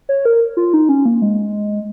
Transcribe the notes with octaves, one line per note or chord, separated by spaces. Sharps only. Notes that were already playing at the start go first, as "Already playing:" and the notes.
C#5
A#4
F4
D#4
C#4
A#3
G#3